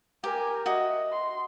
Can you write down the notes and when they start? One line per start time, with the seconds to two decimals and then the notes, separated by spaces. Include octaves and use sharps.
0.24 G4 A#4 G#5
0.66 F#4 D#5 E5
1.12 C6